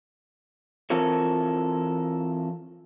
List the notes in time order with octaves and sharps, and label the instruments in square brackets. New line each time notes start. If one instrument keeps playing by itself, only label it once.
[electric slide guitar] E3 C4 F4 A4 A#4 C#5